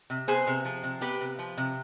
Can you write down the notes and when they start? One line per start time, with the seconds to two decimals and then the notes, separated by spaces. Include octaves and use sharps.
0.10 C3
0.28 B3 G#4 C5
0.47 C3
0.65 F3
0.83 C3
1.01 B3 G4 B4
1.21 C3
1.39 F3
1.57 C3